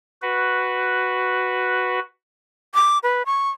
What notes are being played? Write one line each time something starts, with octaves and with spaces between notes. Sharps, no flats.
F#4 B4
D6
B4
C#6